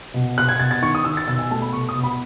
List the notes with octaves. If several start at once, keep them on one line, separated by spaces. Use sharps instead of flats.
B2
B2 F#6
G#6
B2 A6
A6
D#3 C#6
D#6
D#3 E6
A6
B2 E6
G#5
A3 A5
B5
B2 C#6
D#6
B2
B5